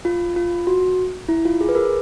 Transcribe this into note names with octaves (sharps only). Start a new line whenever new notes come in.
F4
F4
F#4
E4
F4
G#4
B4
G#4 A#4